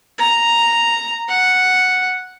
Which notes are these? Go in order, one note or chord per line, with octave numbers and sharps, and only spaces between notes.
A#5
F#5